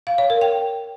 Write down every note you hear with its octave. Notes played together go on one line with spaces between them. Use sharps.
F5
C#5
A#4
G5